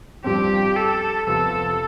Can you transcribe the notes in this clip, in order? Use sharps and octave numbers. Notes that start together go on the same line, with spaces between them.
G2 F3 C4 G4
A4
F2 C3 F3 B3 F4 A4